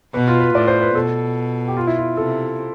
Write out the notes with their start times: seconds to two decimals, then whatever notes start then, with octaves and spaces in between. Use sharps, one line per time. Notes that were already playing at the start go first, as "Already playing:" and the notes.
0.14 B2 B4
0.28 F4
0.40 B4
0.54 A2 D5
0.68 C5
0.81 B4
0.95 B2 A4
1.68 G4
1.77 F4
1.87 E4
1.97 F4
2.17 C3 A4